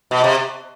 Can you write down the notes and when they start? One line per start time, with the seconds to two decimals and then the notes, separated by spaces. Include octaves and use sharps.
0.11 B2
0.24 C3